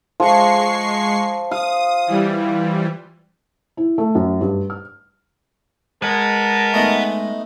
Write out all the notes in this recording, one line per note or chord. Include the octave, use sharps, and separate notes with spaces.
F3 G#3 C#6 C7
F5 D#6
E3 G3
E4
A3
F#2
G2
F6
G#3 A#4 B4 F#5 A5
A3 B3 D#4